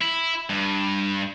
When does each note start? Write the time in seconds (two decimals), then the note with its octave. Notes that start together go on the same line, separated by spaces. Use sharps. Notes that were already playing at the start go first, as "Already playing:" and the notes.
0.02 E4
0.50 G2